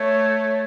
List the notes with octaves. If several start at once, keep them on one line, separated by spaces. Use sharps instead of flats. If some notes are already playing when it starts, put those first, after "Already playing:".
Already playing: A3 C#5